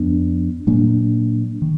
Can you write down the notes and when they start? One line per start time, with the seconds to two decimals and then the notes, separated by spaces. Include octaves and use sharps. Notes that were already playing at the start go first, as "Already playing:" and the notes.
Already playing: F2 F3 B3 D4
0.67 A#2 F#3 A#3 D4
1.62 D#3